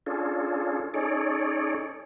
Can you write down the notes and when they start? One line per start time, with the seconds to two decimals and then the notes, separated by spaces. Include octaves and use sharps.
0.06 C#4 D4 F4 G#4 A4
0.94 C#4 D#4 G#4 A4 C#5 D5